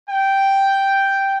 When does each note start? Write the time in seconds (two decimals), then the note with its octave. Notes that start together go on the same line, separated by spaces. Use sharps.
0.10 G5